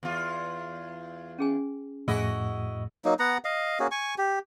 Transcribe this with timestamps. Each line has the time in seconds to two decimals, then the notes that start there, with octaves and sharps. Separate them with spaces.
0.03 E2 F4
1.39 C#4 G#4 G#5
2.08 F2 A2 E4 F#4 G#4 D#5 G#5
3.05 F#3 A#3 D#4
3.19 B3 F#5 A#5
3.45 D#5 F5
3.80 A#3 C#4 F#4 G#4
3.91 G#5 C#6
4.18 G4